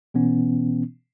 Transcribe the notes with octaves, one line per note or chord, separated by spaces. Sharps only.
B2 E3 B3 C#4